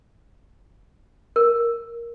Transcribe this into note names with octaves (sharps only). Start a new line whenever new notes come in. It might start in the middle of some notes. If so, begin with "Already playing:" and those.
A#4